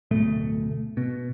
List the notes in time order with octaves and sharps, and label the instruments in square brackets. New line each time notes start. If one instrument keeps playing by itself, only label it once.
[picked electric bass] D1 B2 A3
B2